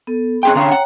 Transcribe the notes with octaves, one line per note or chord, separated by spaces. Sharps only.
B3 A4
C#4 G#4 G5 C6
D3 C#4 C#5 F5 G5 A#5
F#5